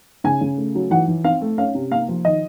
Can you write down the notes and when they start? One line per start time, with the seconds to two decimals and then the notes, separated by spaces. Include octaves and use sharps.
0.24 C#3 G#5
0.41 C#3
0.57 A3
0.75 F#3
0.91 E3 F#5
1.08 E3
1.24 C4 F5
1.42 A3
1.58 C#4 F5
1.75 C3
1.91 A#3 F5
2.08 F3
2.25 D#3 D#5